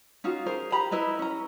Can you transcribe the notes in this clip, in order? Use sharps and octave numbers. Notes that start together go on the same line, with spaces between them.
C#4 D#4 F4 F#4
G#4 A#4 C5
G4 A#5 B5
E4 B4 D#5 A#5
C#4 A#5